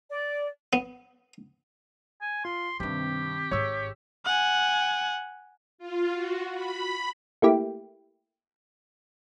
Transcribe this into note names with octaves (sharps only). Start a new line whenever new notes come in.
D5
B3
G#5
F4 C6
G2 C3 D#3 C4 G4
G#1 G#2 C#5 C#6 E6
F#5 G#5
F4
F#4
B5
A3 A#3 E4 G4